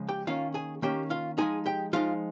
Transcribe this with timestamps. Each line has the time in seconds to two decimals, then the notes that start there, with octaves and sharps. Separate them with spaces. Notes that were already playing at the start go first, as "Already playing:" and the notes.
Already playing: C#3 F3 G#3
0.09 G4 G5
0.27 D#3 A#3 C#4 F4 F5
0.54 G#4 G#5
0.82 D#3 A#3 C#4 G4 G5
1.10 F4 F5
1.38 F3 G#3 D#4 G#4 G#5
1.66 G4 G5
1.93 F3 G#3 D#4 F4 F5